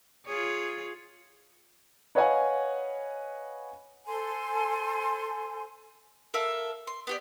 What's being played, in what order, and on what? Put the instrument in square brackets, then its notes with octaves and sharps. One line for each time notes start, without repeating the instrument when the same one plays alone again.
[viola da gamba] F4 G#4 C#5
[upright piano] B4 C#5 D#5 F5 F#5 G#5
[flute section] A4 C5 G#5 C6
[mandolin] A4 A#4 E5 F5
C6
B3 G4 D5